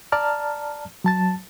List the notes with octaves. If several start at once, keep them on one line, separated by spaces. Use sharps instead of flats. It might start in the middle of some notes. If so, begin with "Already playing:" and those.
D5 A5 A#5 F6
F#3 A5 A6